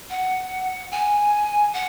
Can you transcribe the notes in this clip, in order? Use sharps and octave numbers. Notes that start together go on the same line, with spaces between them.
F#5
G#5
F#5